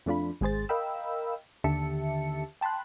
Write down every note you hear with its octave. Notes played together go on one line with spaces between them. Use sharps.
F2 A3 D4 F4 B5
G#1 G#3 G#4 C5 A6
A#4 D#5 F5 G5 B5 E6
D#2 D3 G4 E5 A5 C#7
G5 A5 B5 C6 F#6